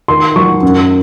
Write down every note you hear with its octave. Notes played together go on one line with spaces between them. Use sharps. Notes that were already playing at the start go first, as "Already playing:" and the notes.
D#3 C6
F#3 C#6
F#2